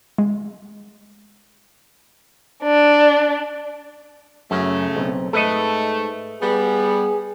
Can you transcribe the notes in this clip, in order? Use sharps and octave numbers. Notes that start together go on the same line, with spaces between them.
G#3
D4
F#2 C#3 A3
B1 C4
G#2 A3 A4 B4 D#5
G3 B3 G#4